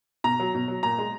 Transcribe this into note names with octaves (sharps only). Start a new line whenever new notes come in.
B2 A#5
F#3
B2
F#3
A#2 A#5
G#3